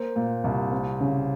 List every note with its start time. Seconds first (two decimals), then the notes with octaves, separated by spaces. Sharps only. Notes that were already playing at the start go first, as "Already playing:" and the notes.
Already playing: A#3 C5
0.16 A#2
0.44 C2
0.72 C4
1.00 C#3